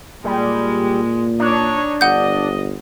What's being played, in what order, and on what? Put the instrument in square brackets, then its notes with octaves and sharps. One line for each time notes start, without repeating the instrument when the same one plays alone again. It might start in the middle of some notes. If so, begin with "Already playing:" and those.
[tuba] A#2 [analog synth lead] G3 [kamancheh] G#3
[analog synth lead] D4 [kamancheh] D#4 C#5
[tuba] G1 [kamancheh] D#5 [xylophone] F#5 G6